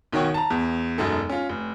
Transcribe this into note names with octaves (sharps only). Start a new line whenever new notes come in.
B1 D#3 D#4 F#4 C#5 G5
A5 A#5
E2
E1 F#2 D#4 A4
C#4 F4
F1